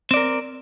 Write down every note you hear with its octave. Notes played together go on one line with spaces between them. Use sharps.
C4 A#4 D5